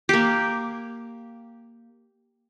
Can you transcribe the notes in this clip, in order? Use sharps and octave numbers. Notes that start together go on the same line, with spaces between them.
A#3 G4